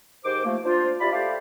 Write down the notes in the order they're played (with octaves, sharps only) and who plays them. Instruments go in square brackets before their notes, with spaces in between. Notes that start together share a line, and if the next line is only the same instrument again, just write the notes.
[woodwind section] G#2 D#3 G4 C5 D6
F3 A3 A#3
D4 F4 C5
E4 F4 G4 D5 B5
A3 G4 C5 D5 F5